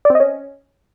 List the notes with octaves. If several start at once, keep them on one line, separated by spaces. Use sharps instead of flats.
D5
C4
D#5
C#4